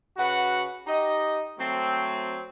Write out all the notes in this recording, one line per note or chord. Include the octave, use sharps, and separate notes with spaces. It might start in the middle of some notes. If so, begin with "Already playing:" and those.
C#3 F#4 B4 F#5
D#4 G4 D#5
F#3 A3 C4